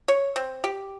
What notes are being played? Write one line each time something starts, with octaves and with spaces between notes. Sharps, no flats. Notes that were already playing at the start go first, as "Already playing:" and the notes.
C#5
C4
G4